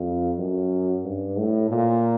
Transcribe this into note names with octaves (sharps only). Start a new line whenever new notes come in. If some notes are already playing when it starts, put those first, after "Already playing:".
Already playing: F2
F#2
G2
A2
A#2